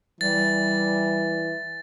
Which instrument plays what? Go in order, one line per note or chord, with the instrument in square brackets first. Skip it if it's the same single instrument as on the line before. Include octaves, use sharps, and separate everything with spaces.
[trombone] E3 [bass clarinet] G3 [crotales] A6